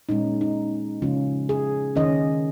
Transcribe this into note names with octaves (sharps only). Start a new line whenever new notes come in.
A#2 G#3 C#4 D#4
D#4
C#3 F3 G#3 C#4 F4
G#4
D#3 C#4 D#5